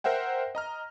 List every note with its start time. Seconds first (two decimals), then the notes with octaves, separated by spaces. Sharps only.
0.04 A#4 C5 E5 F#5 G5
0.55 D#5 A#5 F6